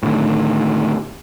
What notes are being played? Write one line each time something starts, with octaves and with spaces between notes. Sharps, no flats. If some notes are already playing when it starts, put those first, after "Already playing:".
A2 D3 D#3